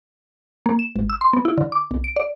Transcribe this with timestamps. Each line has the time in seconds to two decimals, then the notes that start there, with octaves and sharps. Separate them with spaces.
0.66 A#3
0.79 E7
0.96 G#1
1.10 E6
1.21 C6
1.33 B3
1.45 E4
1.58 D3
1.72 D6
1.91 B1
2.04 D7
2.16 D5